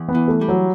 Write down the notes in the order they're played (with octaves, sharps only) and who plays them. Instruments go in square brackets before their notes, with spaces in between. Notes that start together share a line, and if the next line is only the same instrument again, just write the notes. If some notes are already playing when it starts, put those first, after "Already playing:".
Already playing: [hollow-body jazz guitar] E2
[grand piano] B3
[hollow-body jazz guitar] E3
[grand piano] A3
[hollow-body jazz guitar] G3
[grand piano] F#3